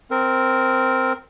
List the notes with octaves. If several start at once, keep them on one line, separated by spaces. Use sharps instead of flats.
C4 A#4